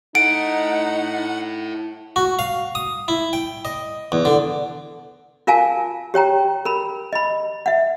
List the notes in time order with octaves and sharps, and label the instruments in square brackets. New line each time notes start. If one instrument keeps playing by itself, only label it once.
[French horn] D#4 [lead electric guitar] E4 A4 [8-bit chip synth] F#5 [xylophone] D7
[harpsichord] F#4
F5
D#6
E4
G5
D#5
E2
D3
[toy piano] F4 A#4 F5 G#5 A5
G4 C#5 G5 A#5
A#4 B5
D#5 B5
E5 F#5